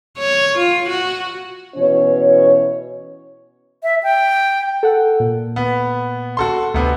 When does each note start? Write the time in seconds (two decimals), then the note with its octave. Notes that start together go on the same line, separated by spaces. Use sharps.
0.19 C#5
0.59 F4
0.89 F#4
1.76 B2 E3 C#4 C#5
3.83 E5
4.03 G5
4.83 A4 F#5
5.20 A#2
5.56 B3
6.37 F#4 A4 C6
6.74 D2 C3 B3 C4